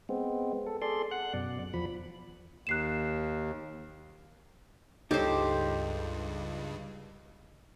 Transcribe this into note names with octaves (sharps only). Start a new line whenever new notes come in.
G#3 B3 C4
A4
G#4 A4 D5 C6
F#5 F#6
F#2 B2 D5
E2 F3 B5
D#2 F#6 C7 E7
C#2 G2 D#4 G4 A4 C5 C#5